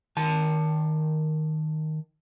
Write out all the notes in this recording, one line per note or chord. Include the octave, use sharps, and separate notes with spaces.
D#3 A5